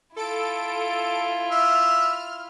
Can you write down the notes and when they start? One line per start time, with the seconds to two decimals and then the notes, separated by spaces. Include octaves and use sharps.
0.16 E4 F4 A4 D7
1.51 E5 F6